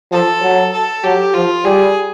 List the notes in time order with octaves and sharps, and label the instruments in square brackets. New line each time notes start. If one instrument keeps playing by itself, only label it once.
[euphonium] F3 [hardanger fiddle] A4
[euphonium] F#3
[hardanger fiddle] A4
[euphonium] F#3 [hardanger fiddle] G4
[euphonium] F3 [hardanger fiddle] F4
[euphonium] G3 [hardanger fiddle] G#4